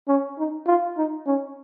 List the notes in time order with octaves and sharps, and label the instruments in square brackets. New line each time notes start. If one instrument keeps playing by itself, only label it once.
[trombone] C#4
D#4
F4
D#4
C#4